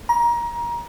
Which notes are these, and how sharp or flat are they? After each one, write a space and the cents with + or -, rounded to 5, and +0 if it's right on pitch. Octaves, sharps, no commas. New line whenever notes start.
A#5 +25